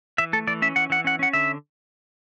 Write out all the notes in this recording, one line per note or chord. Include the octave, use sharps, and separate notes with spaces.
E3 E5
A3 A4
E3 D5
C#4 E5
E3 F#5
E3 F#5
C#4 F#5
C#4 F#5
D3 E5